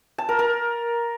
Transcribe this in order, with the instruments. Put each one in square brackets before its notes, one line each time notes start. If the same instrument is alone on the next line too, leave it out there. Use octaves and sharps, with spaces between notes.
[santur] A5
A#4
A#4